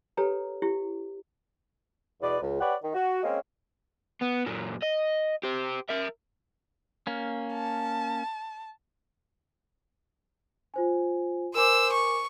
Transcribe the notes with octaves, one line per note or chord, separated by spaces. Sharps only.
G4 A4 B4 C#5 A#5
E4 G4
E2 B2 B4 D5
C#2
G4 B4 C#5 D5 F#5
D#3
F#4
G#3 A#3 C4 C#4
B3
F#2 A#2
D#5
G4 C5
A#4 E5
A#3 C#4
A5
F4 C5 G#5
A#4 C5 G#5 D6 E6
C#6